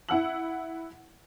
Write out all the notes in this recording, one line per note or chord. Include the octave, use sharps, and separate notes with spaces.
E4 F#5 E6 F#7